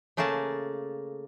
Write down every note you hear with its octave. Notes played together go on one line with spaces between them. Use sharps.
C#3 A3 A#3 G#4 A5